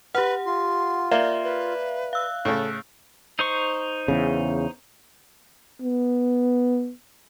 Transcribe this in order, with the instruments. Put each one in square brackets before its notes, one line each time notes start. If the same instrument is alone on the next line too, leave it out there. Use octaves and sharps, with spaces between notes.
[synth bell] G4 F#5 [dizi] B4 [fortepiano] F6
[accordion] F4 [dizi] C6
[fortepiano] A#3 [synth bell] D5 E5 F5
[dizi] B4
[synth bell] F5 E6 [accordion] F#6
[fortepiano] A2 C#3 [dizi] A4
[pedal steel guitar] D#4 C5 C#6
[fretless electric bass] E2 C#3
[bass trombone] B3